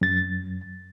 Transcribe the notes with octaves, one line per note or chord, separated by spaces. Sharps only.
F#2 A6